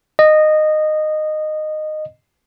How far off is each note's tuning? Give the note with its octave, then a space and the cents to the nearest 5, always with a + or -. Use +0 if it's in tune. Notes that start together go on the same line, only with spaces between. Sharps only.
D#5 -15